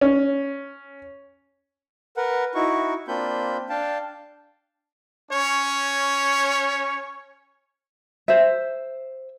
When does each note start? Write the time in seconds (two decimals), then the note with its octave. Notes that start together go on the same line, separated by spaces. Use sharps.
0.01 C#4
2.17 A#4 B4 F#5
2.55 D#4 E4 F#4 C#6
3.08 A#3 C4 D4 F4 B5 G6
3.69 D4 F5 G5 A5
5.31 C#4 C#5
8.28 C5 E5